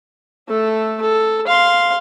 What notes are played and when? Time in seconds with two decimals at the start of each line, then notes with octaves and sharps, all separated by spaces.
0.48 A3 A4
1.02 A4
1.47 F5 C6